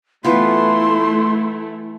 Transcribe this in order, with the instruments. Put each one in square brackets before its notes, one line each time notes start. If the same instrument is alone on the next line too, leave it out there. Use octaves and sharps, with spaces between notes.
[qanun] E3 B3 F4 [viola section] A3 E4 [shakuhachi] C6